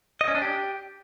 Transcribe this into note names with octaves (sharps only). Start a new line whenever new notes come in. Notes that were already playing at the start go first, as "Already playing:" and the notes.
D#5
C#4
D4
G4